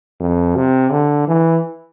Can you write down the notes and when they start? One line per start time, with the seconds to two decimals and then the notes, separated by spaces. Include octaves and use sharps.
0.20 F2
0.56 C3
0.91 D3
1.28 E3